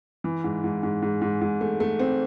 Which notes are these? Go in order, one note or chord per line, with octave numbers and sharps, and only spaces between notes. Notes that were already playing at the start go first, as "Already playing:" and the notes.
E3
G#2
G#2
G#2
G#2
G#2
G#2
A3
A3
C4